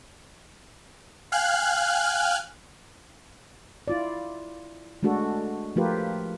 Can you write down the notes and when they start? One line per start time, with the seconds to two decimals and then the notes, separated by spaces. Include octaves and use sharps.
1.32 F5 G5 G#5 F6 F#6
3.88 E4 F4 D5
5.03 G#3 A3 D4 F#4 A4
5.76 F3 A3 F4 G4 A#4 B4